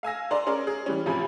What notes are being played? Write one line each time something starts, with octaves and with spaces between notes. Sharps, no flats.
F5 G#5 E6 A#6
D4 D5 A#5 C6
C#4 G#4 A#4 D5
G#4
E3 G3 C#4
A1 C3 F3 G#5 B5